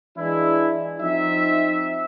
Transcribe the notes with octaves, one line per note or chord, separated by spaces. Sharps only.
E3 G#3 D4 E4
F3 C4 D#4 E5